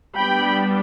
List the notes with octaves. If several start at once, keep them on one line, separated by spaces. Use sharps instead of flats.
G3 B3 D4 G5 B5